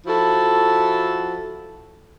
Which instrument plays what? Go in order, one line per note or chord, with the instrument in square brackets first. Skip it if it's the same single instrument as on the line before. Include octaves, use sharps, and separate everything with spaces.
[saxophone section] F3 E4 F#4 A4